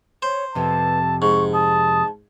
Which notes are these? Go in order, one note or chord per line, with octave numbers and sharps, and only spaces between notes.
C5 C#5
F2 C3 B4 A5
G#2 C#6
A5 D#6